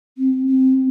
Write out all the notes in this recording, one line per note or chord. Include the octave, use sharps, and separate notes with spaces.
C4
C4